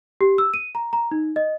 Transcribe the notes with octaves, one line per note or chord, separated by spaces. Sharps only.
G4
E6
D#7
A#5
A#5
D#4
D#5